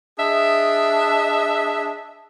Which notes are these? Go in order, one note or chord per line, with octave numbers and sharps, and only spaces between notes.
D4 G#4 D#5 E5